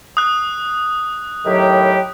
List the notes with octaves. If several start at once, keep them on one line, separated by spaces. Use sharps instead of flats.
D#6 F#6
A2 D#3 F#3 G4